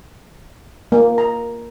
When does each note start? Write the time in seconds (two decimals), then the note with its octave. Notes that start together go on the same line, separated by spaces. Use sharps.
0.92 A#3
1.18 A#5